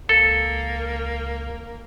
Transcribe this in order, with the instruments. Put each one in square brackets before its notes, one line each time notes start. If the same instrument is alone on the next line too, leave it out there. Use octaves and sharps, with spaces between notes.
[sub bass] C#2 [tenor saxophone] A#3 [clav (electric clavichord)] A4